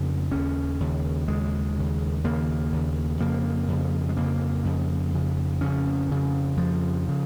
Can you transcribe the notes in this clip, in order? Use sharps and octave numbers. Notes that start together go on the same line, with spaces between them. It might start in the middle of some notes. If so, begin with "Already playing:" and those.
Already playing: F2 C#3 A#3
D#2 C#3 C#4
D#2 C#3
D#2 C#3 G#3
D#2 C#3
D#2 C#3 A#3
D#2 C#3
F2 C#3 A#3
F2 C#3
G#3
F2 C#3 A#3
F2 C#3
F2 C#3
F2 C#3 C#4
F2 C#3
F2 C#3 F3
C#3